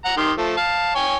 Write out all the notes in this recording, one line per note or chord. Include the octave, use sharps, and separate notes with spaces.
F#5 A#5
D#3 G4 C6
F3 A3
F5 A5
C#5 G5 G#5